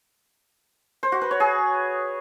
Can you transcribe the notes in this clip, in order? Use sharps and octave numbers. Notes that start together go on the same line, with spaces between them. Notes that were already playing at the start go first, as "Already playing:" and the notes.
C5
F#4
B4
C#5
G#4